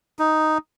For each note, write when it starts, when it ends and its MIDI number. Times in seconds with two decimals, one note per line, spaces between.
0.19 0.58 63